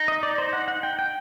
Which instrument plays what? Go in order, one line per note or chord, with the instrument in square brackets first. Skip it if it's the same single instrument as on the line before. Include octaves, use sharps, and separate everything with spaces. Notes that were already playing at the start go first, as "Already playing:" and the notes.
Already playing: [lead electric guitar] D#4
[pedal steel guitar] D#5
D5
C5
F#5
F#5
G5
G5